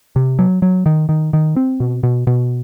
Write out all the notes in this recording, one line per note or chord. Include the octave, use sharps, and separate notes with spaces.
C3
F#3
F#3
D#3
D#3
D#3
C4
B2
B2
B2